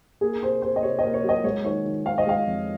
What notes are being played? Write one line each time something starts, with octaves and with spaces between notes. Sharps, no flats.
A#3 G#4
C3 C5
C3 C5
D#5
C3 C#5
A#3 D#5
C#5
F#3 D#5
G#3 C#5
D#3 C#5
D#3
D#3 F5
D#5
G#3 F5
F2